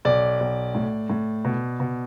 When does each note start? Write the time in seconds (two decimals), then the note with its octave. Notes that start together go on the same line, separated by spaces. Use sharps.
0.05 B1 D5
0.40 B1
0.75 A2
1.10 A2
1.45 B2
1.80 B2